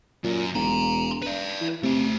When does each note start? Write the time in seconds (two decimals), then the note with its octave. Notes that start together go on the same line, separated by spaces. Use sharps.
0.24 F#2 A#2
0.55 E1 A#5 C6
1.22 B4 D5
1.61 E3
1.83 C3 A3 C5